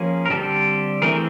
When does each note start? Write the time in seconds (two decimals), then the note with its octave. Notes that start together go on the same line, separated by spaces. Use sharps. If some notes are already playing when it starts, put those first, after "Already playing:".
Already playing: F3 A#3 C#4 G#4
0.26 A#4
0.30 D3 G3 C4 G4 A4
1.02 E3 A3 C4 G#4 A#4